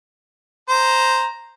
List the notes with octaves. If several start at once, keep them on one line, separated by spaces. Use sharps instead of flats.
C5 A#5